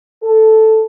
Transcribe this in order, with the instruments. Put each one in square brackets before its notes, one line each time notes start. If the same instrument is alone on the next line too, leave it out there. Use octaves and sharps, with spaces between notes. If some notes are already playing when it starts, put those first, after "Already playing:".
[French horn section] A4